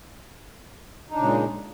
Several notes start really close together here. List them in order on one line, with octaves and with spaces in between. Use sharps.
D#4 D4 C#3 A#2 G#3